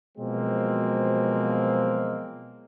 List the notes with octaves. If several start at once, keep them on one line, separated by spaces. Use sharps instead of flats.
B2 F3 F#3 G#3 A#3 C4